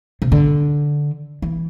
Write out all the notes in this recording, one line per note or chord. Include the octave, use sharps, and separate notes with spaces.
C3
D3
E3